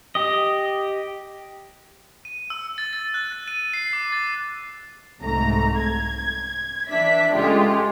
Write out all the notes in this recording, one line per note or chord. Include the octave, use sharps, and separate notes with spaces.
G4 D#5
D#7
E6
A6
A6
F#6
A6
D#7
C7
D6
A6
C2 G#2 A3 A#5
G#6
E3 D4 D5 E5 B6
C#2 G#3 A3 F4 G4